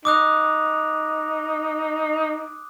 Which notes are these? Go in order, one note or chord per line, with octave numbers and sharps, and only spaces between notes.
D#4 D6 D#6 F#6